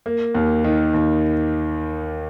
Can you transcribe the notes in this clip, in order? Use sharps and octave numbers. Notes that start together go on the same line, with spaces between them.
A#3
D#2
D#3
D#2